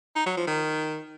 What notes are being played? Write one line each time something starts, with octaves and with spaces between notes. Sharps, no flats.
D#4
F#3
F3
D#3